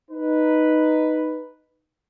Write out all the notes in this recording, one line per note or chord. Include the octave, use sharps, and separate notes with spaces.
D#4 B4